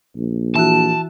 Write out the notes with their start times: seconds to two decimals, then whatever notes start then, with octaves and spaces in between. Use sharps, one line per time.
0.16 A#1
0.55 E3 E4 F#4 A5